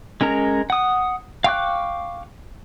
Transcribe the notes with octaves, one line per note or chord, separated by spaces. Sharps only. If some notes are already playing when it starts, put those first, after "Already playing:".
G#3 C#4 A#4 A#5
F#5 D#6
F5 G5 C#6 D6 F#6